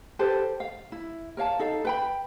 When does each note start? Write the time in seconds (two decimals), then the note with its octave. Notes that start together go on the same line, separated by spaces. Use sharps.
0.19 G4 A4 B4 C5
0.60 F5
0.92 E4
1.37 A#4 C#5 F5 A5
1.59 D#4 A4 F5
1.85 B4 G5 B5